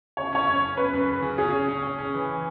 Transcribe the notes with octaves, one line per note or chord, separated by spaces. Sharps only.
C#3 C#5
C#4 C#5
F#2
C#4
C#4 B4
F#2
C#3
C#3
C#4 G#4
C#4
C#4
C#4
C#4
E3